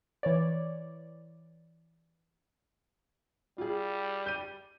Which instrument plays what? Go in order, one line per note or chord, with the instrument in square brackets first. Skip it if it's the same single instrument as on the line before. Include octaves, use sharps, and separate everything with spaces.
[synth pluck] E3 C#5 D5
[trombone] G3 [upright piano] F4 G#4
[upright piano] G6 D#7